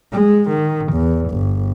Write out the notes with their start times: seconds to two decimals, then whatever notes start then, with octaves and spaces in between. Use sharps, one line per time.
0.12 G#3
0.50 D#3
0.93 E2
1.30 G1